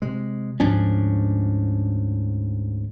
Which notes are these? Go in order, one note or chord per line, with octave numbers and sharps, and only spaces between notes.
C3 G#3
D2 G#2 F3 C#4 D4